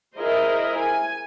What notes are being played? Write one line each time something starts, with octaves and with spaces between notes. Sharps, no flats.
E4 G#4 A#4 C5 D#5
G#5